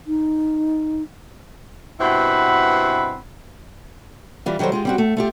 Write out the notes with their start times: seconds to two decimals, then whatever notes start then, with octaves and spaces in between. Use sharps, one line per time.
0.07 D#4
2.00 G2 B2 C4 E4 F#5 B5
4.46 E3 G3 F4
4.59 D#3 F#3 G3 A4 C5
4.72 G#3 F4 G4
4.85 G3 C4 F#4
4.98 A3
5.17 A3 F4 G4